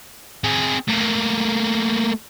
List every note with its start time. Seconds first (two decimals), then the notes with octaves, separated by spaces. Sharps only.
0.44 C4 G#4
0.88 A3 A#3